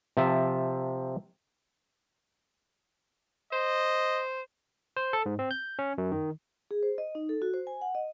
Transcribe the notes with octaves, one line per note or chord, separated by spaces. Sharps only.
C3 F3 E5 A5
C5 D#5
C5
A4
G#2
C4
G6
C#4
F#2
D#3
G#4
C5
D#5
D#4
A4
F#4
C5
G#5
F#5
D#5